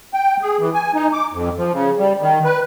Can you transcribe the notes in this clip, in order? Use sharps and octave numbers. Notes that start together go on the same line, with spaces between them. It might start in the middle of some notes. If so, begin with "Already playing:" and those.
G5
G#4
E3
G#5
D#4
D6
F2
F3
C#3
G3
D#3
B4